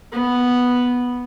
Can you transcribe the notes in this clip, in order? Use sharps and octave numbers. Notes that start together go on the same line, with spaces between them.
B3